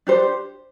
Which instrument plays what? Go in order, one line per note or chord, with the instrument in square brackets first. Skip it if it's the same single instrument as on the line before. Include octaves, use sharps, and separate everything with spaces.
[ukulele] D4 G4 C5